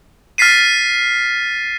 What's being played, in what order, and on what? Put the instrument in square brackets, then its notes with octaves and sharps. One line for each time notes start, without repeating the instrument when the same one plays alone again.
[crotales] F6 A6 B6 C7 D#7